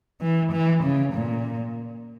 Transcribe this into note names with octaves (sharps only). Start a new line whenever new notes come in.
E3
E3
C#3
A#2